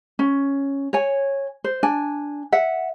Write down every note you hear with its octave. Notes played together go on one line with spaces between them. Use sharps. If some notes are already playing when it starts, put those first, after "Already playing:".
C#4
C#5 G#5
C5
D4 G#5
E5 F#5